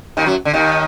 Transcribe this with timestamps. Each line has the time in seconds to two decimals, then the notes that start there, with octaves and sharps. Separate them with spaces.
0.17 D#2 D#3
0.26 F#2 F#3
0.45 D3
0.53 D#2 D#3